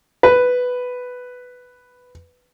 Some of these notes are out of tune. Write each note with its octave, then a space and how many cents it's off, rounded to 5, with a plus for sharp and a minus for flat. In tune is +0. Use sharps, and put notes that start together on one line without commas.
B4 +5